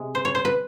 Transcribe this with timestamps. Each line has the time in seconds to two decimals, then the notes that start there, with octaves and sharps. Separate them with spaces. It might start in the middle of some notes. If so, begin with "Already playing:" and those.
Already playing: C3 G#3
0.15 C5
0.25 C#5
0.35 C5
0.45 B4